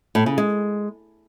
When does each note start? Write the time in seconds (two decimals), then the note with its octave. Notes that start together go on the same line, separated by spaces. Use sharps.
0.15 A2
0.26 C#3
0.38 G#3